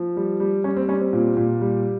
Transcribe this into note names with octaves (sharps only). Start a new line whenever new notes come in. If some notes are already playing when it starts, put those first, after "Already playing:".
Already playing: F3
G3
G3
G3 C#4
C4
G3 C#4
C4
A#2
A#2
G3